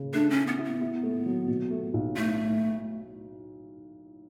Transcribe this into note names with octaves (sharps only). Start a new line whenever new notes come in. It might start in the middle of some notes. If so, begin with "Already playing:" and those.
Already playing: C#3
A3 D4
C#4
E4
B3
E4
B3
E4
A3
F#3
B2
A3
B1
A2 A3
A2